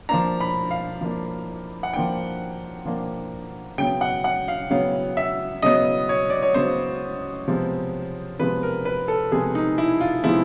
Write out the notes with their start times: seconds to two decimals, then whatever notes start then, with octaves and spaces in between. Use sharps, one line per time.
0.09 F3 A#3 D4 A#5
0.41 B5
0.71 F5
1.01 F3 A#3 D4
1.83 F#5
1.94 F3 A#3 D4 G5
2.86 F3 A#3 D4
3.78 C#3 F#3 B3 G5
4.01 F#5
4.24 F#5
4.48 F5
4.70 C#3 F#3 B3 F5
5.17 E5
5.62 C#3 F#3 B3 D#5
6.09 C#5
6.30 D5
6.42 C#5
6.54 C#3 F#3 B3 C5
7.48 C3 F3 G#3 B3
8.39 C3 F3 G#3 B3 B4
8.63 A#4
8.85 B4
9.08 A4
9.32 C3 F3 G#3 B3 G#4
9.55 D#4
9.78 E4
10.01 F4
10.24 C3 F3 G#3 B3 E4